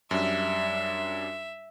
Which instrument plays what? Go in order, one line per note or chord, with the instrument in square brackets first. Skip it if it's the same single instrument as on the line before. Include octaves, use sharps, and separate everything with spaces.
[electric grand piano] F#2 G3 D4 [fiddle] E5